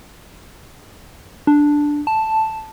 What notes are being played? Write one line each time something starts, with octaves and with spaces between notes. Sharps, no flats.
D4
A5